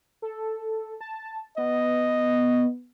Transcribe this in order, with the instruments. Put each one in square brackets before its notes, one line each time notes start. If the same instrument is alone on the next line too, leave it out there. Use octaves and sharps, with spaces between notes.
[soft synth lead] A4
A5
[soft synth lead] B3 [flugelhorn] D#5